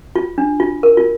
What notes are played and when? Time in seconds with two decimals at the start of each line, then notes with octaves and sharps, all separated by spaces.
0.16 F4
0.38 D4
0.60 F4
0.83 A#4
0.97 F4